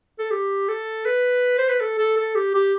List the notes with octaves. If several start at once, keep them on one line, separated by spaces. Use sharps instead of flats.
A4
G4
A4
B4
C5
B4
A4
A4
A4
G4
G4